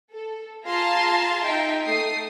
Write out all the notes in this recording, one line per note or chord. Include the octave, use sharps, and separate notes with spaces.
A4
F4 G#4 F5 A5 A#5 C6
D#4 E5 G5
A3 D#6 C7